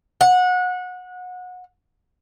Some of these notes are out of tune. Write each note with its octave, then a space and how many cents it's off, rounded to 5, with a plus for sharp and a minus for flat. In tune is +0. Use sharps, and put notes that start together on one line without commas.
F#5 -25